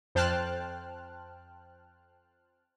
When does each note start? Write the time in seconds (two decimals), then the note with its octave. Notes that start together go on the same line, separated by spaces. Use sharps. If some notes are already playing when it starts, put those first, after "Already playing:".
0.15 F2 C5 G5 A5 F6 F#6